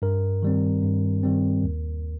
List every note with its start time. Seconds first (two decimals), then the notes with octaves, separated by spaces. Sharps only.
0.02 G2 A#4
0.42 D#3 G3 C4
0.83 G2
1.23 D#3 G3 C4
1.64 D#2